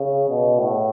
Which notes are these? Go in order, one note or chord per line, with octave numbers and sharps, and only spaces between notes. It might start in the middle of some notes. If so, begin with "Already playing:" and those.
Already playing: C#3
B2
A2